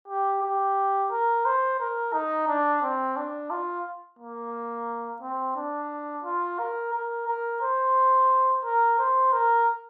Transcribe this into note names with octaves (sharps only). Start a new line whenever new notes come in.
G4
G4
A#4
C5
A#4
D#4
D4
C4
D4
F4
A#3
C4
D4
F4
A#4
A#4
A#4
C5
A#4
C5
A#4